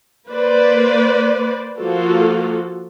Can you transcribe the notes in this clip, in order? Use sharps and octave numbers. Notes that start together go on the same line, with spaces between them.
A#3 B4 C5 D5
F3 A#3 F4 F#4 A4